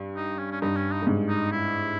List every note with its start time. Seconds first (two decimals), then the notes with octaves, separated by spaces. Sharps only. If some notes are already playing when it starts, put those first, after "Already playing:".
Already playing: G2
0.16 D#4
0.39 C#4
0.51 C#4
0.62 G2 D#4
0.77 C#4
0.92 D#4
1.02 G2
1.07 G#2
1.29 D#4
1.52 E4